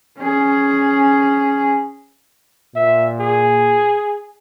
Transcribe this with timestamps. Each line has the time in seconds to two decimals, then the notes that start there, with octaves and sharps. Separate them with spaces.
0.19 C#4 G#4
2.75 A#2 E5
3.20 G#4